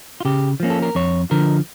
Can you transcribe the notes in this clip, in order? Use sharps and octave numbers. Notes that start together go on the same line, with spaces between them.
F4
C#3 G4
F3 A#3 C#4
A4
A#4
F2 C#5
D3 F3 A#4